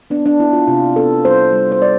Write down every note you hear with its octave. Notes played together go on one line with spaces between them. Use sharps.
B3 D4
D4
B3 E4
F4
C3 F4
B3 A4
G3 C5
G3
C5
G3 D5